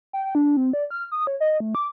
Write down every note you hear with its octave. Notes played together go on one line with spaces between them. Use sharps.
G5
D4
C4
D5
F6
D#6
C#5
D#5
A3
D6